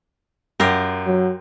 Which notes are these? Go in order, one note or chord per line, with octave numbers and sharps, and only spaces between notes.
F#2 F4 G4 A#4
F#3